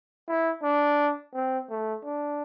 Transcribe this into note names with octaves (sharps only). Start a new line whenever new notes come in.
E4
D4
C4
A3
D4